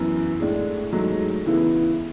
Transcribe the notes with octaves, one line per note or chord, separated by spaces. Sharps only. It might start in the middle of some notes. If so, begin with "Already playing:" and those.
Already playing: F#2 E3 B3
A2 G#3 D4 G#4
G#2 F#3 A3
C#3 E3 B3 E4